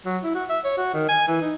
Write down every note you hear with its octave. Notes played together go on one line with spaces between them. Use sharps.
F#3
E4
F#4
E5
C#5
F#4
D#3
G#5
E3
D#4